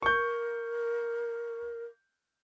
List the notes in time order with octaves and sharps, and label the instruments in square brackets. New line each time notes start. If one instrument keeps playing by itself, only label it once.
[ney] A#4 [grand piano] C#6 G6